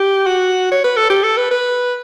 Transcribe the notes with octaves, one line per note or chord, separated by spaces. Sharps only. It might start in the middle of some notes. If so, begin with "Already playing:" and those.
Already playing: G4
F#4
C#5
B4
A4
G4
A4
B4
B4